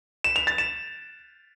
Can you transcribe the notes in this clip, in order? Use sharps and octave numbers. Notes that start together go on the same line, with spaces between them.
E7
F7
A6
E7